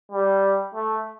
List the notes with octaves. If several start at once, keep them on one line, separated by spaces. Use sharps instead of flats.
G3
A3